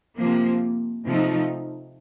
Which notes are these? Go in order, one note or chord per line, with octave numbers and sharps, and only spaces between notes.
C3 F3 A#3
C3 F3 A3 D#4